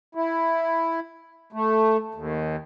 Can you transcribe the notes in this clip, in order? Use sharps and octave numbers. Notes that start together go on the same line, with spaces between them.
E4
A3
D#2